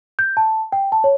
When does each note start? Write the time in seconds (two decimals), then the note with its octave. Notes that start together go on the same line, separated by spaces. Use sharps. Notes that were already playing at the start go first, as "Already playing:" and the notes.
0.19 G6
0.37 A5
0.72 G5
0.92 A5
1.04 C#5